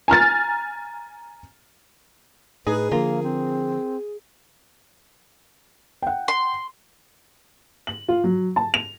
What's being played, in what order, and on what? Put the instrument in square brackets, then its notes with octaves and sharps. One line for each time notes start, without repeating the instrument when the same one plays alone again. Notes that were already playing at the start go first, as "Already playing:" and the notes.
[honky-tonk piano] G#5 A#5 F6 A6
[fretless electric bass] A2 [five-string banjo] D#4 [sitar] G#4 [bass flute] B4
[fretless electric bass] D3 F3 [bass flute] A#3 [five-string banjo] F4 A#4
[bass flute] C4
[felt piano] F#5 G5
[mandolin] C6
[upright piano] F#7
F4
F#3
A5
F7